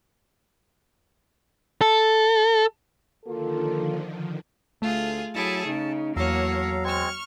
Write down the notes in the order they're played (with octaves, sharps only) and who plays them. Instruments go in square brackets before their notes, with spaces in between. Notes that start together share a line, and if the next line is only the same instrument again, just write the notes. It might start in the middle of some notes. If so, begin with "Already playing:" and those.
[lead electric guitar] A4
[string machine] D3 D#3 F3 [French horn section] A#3 F4 A4
[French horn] D2 [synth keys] A3 [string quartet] F4 G#4
[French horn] F#3 [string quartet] E4 G#4 A4 [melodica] A5
[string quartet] C#3 [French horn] D#4
[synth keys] E2 [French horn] F#3 [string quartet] A#3 C#5 F#5 [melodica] A4 F5 A#5
[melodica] G#3 C4 C#5 [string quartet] C#6 F6